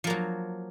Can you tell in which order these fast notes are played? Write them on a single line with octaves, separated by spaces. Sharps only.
F3 A#3 F#3